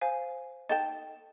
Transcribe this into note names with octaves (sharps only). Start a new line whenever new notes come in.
C5 F5 G#5
D#4 A4 G5 A6 E7